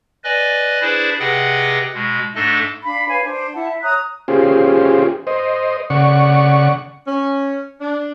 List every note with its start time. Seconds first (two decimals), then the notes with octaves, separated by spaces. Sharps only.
0.24 B4 D5 D#5 G#5
0.81 D4 E4 G#4 B4 C5 D5
1.20 C3 G#4 B4 D#5 F#5 G5
1.94 B2 G#3
2.35 G#2 A3 D4 A4 D#5
2.84 D4 F5 B5
3.08 B4 C#5 F5 G#5
3.25 D4 C5
3.54 E4 F#5 A5
3.68 E5
3.83 C#5 A#5 D#6 F#6
4.28 C#4 F4 G4 G#4 C5
5.27 C5 D#5
5.90 C#3 D5 F#5 C#6
7.07 C#4
7.81 D4